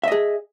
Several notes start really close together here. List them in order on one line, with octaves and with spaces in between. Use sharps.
E5 D#5 G#4